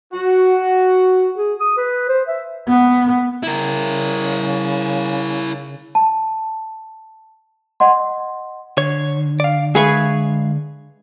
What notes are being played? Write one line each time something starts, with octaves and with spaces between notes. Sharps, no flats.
F#4
G#4
D#6
B4
C5
E5
B3
C#3 E4 A#4
A5
D#5 F#5 C6
D3 C#5
D5 F5
G#3 G#4 B4 E5 F5 C#6